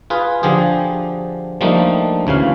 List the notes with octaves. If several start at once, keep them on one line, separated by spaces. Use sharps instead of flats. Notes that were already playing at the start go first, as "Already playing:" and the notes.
F4 G#4 B4
D3 F3 G4 G#4
F3 G3 A3 A#3 D4 D#4
D2 C#3 E3 F5